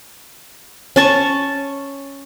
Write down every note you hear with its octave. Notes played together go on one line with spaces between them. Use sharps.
C#4 A5 C#6